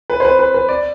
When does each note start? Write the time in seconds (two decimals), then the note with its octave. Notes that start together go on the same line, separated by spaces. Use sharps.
0.10 B4
0.20 C5
0.25 B4
0.39 B4
0.54 B4
0.69 D5